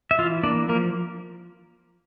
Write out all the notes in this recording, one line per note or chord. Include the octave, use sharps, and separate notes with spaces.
E5
E3 F4 F5
A#3 D4 D5
F3 A#3 A#4